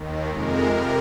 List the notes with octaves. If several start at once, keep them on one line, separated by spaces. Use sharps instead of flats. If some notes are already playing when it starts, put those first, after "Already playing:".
Already playing: D#2 D#3
F2 C3 G#3 A#4
F2 C3 A#4